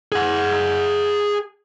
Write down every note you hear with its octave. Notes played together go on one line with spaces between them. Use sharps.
G#4 F#5